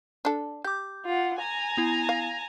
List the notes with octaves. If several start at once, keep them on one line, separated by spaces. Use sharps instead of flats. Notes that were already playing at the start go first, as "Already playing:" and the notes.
D4 A4
G4 D6 G6
F4 F#5
G#5 A#5
B3 E4
F5